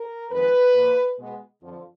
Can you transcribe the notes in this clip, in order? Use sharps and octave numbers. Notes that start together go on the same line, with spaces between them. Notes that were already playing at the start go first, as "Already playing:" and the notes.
Already playing: A#4
F2 D#3 G#3 B3 B4
A#2 F3 A#3
B2 G#3 B3
F2 D3 F3